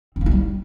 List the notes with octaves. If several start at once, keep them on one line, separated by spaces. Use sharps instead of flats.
C4
A#3
E4
G3